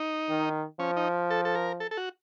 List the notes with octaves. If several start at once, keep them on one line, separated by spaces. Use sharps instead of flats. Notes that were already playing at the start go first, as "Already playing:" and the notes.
Already playing: D#4
D#3
F3 C#4
D#4
A4
A4
A#4
A4
A4
F#4